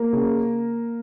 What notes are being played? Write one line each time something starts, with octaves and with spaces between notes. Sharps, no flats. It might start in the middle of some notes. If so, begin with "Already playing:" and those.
Already playing: A#3 A#4
C#3